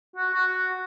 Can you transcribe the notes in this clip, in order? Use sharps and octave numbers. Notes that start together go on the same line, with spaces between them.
F#4
F#4